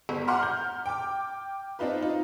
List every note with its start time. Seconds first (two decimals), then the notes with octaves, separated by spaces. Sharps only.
0.09 G1
0.28 F#5 A#5 C6 D6 F6
0.43 G6
0.86 G5 D6
1.79 C4 D4 D#4 F4 B4
2.02 D#4 F4